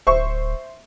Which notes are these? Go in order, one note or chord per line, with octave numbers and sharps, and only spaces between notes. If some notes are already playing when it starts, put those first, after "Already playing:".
D1 C5 E5 C#6